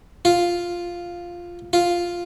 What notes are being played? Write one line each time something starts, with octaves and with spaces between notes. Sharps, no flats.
F4
F4